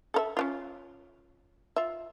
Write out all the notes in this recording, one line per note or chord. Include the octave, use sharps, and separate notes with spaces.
A4 A#4 E5
C#4 D4 F4
F4 E5